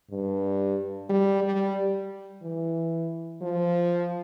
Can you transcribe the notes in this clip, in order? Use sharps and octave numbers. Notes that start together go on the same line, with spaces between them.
G2
G3
G3
E3
F3